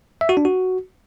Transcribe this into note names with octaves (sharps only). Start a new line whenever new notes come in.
E5
F#4
D4
F#4